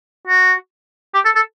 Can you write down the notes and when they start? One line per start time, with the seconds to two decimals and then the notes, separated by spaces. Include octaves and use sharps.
0.27 F#4
1.14 G4
1.25 A4
1.36 A4